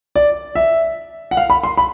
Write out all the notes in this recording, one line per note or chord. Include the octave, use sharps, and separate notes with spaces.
D5
E5
F#5
F5
B5
C6
B5